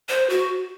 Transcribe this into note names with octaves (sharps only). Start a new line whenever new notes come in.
C5
F#4